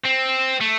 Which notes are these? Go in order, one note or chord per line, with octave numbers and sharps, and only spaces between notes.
C4
A3